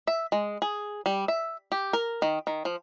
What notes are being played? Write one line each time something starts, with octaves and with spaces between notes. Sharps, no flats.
E5
G#3
G#4
G3
E5
G4
A#4
D#3
D#3
F3